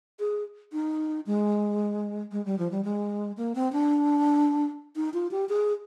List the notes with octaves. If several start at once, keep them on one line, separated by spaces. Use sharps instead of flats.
G#4
D#4
G#3
G#3
G3
F3
G3
G#3
A#3
C4
D4
D#4
F4
G4
G#4